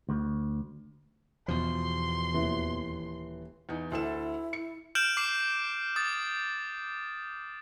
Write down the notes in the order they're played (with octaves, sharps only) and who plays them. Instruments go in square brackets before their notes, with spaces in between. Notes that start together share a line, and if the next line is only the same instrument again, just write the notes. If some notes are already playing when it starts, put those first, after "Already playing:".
[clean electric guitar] D2
[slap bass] E2 B2 F3 [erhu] C6
[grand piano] D#1 E3
[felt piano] E2 D#4
[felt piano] D2 A4 E7 [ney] E4
[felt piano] C#7
[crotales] F6 G6 D7 E7 F#7
D6 C7 E7 F#7
D#6 A6